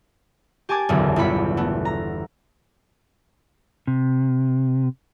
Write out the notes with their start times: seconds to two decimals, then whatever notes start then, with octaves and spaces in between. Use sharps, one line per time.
0.69 G4 G#5 A5 D6 G#6
0.89 F#1 B1 E2 D3 E3
1.16 G1 E2 G3 B5 C#7
1.57 A3 B3
1.85 A#5
3.87 C3